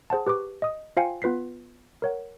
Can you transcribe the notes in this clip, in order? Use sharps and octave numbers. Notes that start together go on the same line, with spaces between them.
G#4 C5 F#5 A5
G4 B4 C#6 D6
D#5 D#6
F4 C5 F5 G5 G#5 C#7
B3 F4 B4 B6 C7
A#4 C#5 F#5